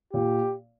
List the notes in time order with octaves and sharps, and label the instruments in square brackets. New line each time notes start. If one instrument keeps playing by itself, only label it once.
[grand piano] A#2 [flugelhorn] G4